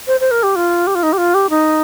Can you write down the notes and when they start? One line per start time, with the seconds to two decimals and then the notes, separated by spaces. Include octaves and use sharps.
0.07 C5
0.20 C5
0.31 A#4
0.43 G4
0.56 F4
0.87 G4
0.95 F4
1.03 D#4
1.13 G4
1.18 F4
1.34 G4
1.50 D#4